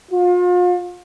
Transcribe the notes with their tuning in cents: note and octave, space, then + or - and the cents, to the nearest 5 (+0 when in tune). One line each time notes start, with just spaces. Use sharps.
F4 +40